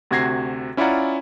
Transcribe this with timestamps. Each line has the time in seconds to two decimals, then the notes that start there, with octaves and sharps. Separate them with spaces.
0.11 D2 C3 F#4 G#6 A#6 C7
0.77 C#4 E4 F4 D5 F#5 A#5